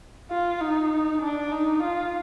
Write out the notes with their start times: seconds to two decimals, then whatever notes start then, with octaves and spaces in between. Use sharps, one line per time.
0.31 F4
0.61 D#4
1.22 D4
1.52 D#4
1.83 F4